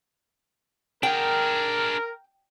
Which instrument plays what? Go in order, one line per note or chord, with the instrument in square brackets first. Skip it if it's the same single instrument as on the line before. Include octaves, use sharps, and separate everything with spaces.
[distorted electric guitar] D4 G#4 [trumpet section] A#4 [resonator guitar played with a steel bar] G5